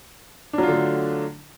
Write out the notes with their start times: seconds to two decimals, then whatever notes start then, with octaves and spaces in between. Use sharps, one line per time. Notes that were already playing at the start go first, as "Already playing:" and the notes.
0.53 D4
0.58 F#3
0.63 F4
0.68 D3
0.72 A3